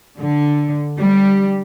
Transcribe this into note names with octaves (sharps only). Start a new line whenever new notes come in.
D3
G3